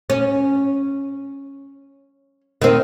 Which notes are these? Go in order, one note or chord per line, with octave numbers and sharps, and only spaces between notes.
C#4
D#3 C4